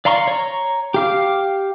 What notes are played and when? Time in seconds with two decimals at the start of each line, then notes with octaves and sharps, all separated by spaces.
0.05 D5 F5 A#5 C6 C#6
0.27 C#5 A#5
0.94 G4 F5 D6